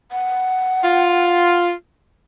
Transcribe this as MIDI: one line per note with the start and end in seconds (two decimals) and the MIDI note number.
0.12 1.56 78
0.84 1.72 65